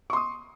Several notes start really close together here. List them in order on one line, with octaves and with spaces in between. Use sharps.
C#6 C6 D#6